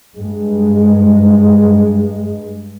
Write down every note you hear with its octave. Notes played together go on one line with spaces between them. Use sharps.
G2 G#3